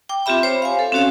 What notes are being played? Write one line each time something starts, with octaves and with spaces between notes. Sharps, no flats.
G5 D6
C4 F4 G4 E5 B5
C5 C#5
F5 G#5
A4
C4 C#4 F#4 C#5 F5